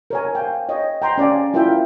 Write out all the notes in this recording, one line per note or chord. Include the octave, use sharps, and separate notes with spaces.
A#4 C#5 G#5
F5 G5
C#5 D#5 G5
G5 A#5 C6
C#4 D5 F5 G#5
E4 F4 A#4 E5 G5